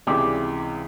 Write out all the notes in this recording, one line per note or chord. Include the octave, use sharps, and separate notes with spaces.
C#2 C3 E3 G3 G#3 G4